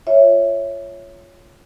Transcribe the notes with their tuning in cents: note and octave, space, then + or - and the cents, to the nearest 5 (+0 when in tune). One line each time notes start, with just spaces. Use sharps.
F4 +0 C#5 +0 E5 +0